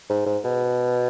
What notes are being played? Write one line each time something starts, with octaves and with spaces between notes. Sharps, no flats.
G#2
G#2
B2